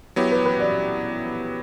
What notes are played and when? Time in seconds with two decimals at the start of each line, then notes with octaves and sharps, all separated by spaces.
0.16 F#3 B3 E4 G4 C#5
0.31 B4
0.45 B4
0.60 D5